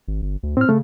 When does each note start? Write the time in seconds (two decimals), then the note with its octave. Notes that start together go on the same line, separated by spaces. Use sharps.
0.08 G#1
0.22 G1
0.43 D2
0.57 A2 C4 F6
0.69 C#3 A3